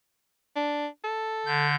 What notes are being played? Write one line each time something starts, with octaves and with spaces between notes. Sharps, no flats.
D4
A4
D3 G6